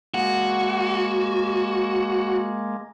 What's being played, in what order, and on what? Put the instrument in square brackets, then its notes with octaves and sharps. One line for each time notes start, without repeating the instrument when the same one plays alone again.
[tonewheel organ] G#3 A#3 [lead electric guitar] F#4